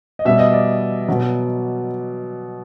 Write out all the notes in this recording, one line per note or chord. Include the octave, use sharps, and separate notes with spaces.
D#5
B2 G3 E5
D#5
D5
B2 F#3